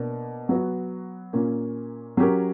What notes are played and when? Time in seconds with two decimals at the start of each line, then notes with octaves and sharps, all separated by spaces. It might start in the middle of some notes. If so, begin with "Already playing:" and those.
Already playing: B2 A#3 D4
0.49 F#3 B3 F#4
1.33 A#2 A#3 C#4
2.17 F#3 C#4 G4 A#4